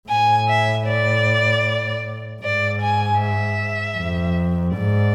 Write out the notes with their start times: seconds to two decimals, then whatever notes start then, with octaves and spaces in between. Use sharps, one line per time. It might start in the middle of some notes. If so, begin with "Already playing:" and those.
0.09 A2 G#5
0.48 E5
0.87 D5
2.42 G#2 D5
2.82 G#5
3.21 E5
3.98 F2
4.76 G#2 D5